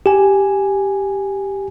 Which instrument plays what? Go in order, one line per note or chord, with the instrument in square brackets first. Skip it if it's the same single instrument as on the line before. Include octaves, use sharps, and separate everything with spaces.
[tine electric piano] G4 G#5